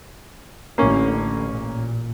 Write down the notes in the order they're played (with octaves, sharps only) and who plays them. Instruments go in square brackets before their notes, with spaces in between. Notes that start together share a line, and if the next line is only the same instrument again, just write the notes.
[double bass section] A1 D3 [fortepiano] A#3 C#4
[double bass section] A#2